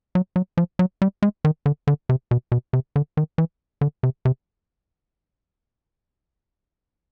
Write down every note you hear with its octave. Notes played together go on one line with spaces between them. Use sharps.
F#3
F#3
F3
F#3
G3
G#3
D#3
D3
D3
C3
B2
B2
C3
D3
D#3
E3
D3
C3
C3